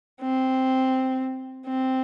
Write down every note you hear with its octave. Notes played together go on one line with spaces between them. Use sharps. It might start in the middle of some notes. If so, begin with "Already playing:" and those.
C4
C4